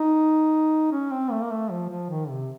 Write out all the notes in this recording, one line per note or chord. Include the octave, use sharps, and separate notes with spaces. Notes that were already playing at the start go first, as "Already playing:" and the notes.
Already playing: D#4
C#4
C4
A3
A#3
A3
F3
F3
D#3
C3